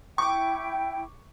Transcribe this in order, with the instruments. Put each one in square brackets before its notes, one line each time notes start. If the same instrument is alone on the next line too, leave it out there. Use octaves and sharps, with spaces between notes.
[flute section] E4 G5 [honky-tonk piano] C#6 D6